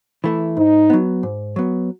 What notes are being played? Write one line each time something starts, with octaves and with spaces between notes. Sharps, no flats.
E3 A3 E4
G#2 D#4
F#3 B3
G#2
F#3 B3